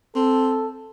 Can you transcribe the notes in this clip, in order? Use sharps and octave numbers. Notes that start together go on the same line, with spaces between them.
C4 A4